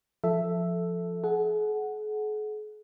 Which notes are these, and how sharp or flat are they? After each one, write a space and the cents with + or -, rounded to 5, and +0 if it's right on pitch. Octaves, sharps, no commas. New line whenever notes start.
F3 +0 A4 +0 E5 +5
G#4 +45 F#5 +0